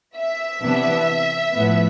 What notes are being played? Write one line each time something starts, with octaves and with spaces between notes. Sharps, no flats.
E5
C3 E3 B3 D4
A2 F3 B3